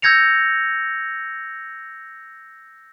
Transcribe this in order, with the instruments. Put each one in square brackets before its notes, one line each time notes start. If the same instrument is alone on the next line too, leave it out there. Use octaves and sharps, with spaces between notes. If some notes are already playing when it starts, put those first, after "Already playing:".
[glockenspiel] E6 G6 G#6 A#6 C#7 F7